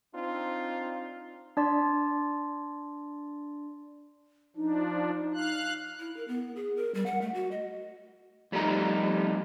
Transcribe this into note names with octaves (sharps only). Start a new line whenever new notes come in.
C4 D4 D#4 F4
D4 D5 C6
F3 D4 D#4
D#4
F5 F#6
E4
A#4
B3
G#4
A#4
G3
F#5
A3
F#4
D#5
F2 G3 A3 D#4 A#5